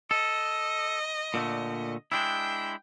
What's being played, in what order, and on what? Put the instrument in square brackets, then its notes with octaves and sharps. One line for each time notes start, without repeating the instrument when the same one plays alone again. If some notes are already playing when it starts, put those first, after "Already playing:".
[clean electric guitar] A4 [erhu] D#5
[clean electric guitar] A#2 D3 A3
[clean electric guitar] G#3 D4 E4 [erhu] G5